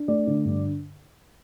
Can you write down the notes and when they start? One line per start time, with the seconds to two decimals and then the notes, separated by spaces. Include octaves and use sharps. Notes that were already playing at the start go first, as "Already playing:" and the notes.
Already playing: D4
0.08 A3 D5
0.27 D3
0.45 G2